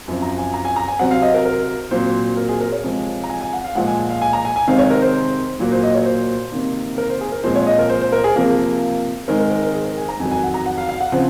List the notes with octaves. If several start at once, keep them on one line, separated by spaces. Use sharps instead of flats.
F#2 F3 C4
A#5
G#5
A#5
G#5
A#5
G#5
C3 F#3 C4 F#5
F5
D#5
A#4
A#4
A#2 F#3 C4 C5
A#4
G#4
A#4
C#5
C3 F3 G#3
A#5
G#5
G#5
F#5
F5
A#2 F3 G#3 F#5
G#5
F5
G#5
A#5
G#5
G#5
C3 D#3 G#3 C4 F5
C#5
A#4
C5
A#2 F#3 A#3
C5
D#5
C#5
C5
C3 D#3 A#3
A#4
C5
G#4
A#4
A#2 F3 G#3 C4 C5
C#5
D#5
A#4
C5
C5
A#4
G#4
C3 F3 A#3 A#4
G#2 D#3 G#3 C4 A#4
A#4
A#4
A#4
G#4
A#4
G#5
A#5
F2 D#3 F#3 G#5
G#5
F#5
A#5
F#5
F5
F5
F#5
C#3 F3 C4